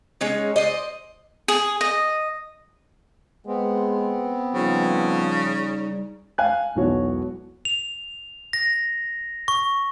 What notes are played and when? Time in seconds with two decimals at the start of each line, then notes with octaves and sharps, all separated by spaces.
0.21 G#3 C#4 D#4
0.56 C5 D5 D#5
1.48 G#4
1.81 D#5
3.47 G#3 B3 C4
4.54 C#3 F3 G3 D#4
6.38 F5 G#5 F#6
6.75 E1 B1 E3 F#4 C#5
7.65 F7
8.53 A#6
9.48 C#6